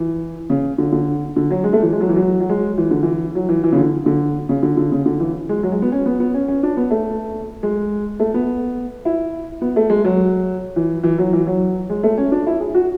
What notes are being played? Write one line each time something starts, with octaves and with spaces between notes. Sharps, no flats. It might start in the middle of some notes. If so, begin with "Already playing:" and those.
Already playing: E3
C#3
D3
D3
D3
F#3
G#3
A3
E3
G#3
F#3
E3
F#3
F#3
G#3
E3
D3
E3
F#3
E3
E3
C#3
D3
D3
C#3
D3
D3
C#3
D3
E3
G#3
F#3
G#3
B3
C#4
B3
B3
C#4
C#4
D4
B3
A3
G#3
A3
B3
E4
B3
A3
G#3
F#3
E3
E3
F#3
E3
F#3
G#3
A3
C#4
D4
E4
G#4
F#4